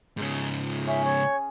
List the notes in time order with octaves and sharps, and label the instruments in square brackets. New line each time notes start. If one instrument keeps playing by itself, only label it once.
[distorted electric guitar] G#2 C#3
[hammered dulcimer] C#4 G#4 [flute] E5
[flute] C#5